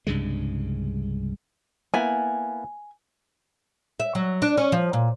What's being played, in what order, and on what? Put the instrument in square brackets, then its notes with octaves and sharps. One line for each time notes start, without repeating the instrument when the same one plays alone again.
[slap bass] C2 G2 C#3 G#3
[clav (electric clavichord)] A#3 B3 E4 [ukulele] G#5
[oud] E5
F#3
D4
C#4
F3
A#2